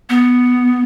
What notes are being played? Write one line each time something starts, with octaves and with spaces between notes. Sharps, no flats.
B3